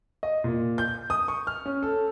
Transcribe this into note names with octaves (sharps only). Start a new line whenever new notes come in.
D#5
A#2
G6
D#6
C#6
F6
C#4
A4